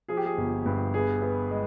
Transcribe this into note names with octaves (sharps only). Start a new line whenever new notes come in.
F3 G#4
G4
G#4
G1
G2
B3 G#4
B3
G#3